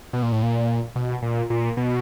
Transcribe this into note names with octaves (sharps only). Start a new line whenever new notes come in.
B2
A#2
A2
A#2
B2
A#2
A#2
B2